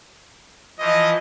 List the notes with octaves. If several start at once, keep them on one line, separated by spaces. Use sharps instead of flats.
E3 F3 D#5